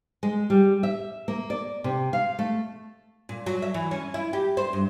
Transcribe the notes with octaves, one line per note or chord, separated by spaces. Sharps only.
G#3
G3
E5
A#3
D5
C3
F5
A3
A#2
F#3
E5
E3
C#4
E4
G4
C5
G2